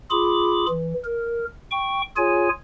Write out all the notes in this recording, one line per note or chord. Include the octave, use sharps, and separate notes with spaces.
F4 G#4 B5 D6
E3
A#4
G5 C#6
F4 G#4 C#5 G#5